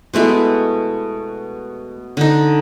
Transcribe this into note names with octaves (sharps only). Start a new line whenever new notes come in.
B2 G#3 A3 E4
D3 D#4